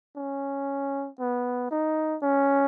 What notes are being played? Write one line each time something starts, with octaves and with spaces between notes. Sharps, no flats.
C#4
B3
D#4
C#4